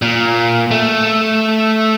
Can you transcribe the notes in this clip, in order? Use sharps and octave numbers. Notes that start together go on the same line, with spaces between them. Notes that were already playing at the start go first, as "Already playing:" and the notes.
A#2
A3